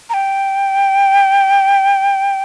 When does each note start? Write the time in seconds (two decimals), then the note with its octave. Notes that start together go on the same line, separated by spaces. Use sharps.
0.10 A#5
0.14 G5